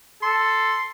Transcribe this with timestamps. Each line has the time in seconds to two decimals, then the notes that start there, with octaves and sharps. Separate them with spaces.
0.23 A4 C6